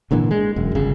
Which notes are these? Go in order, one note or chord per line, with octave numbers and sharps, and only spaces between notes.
G#1 A#2 D3 E3
G#3
E1 F#2
G1 C#3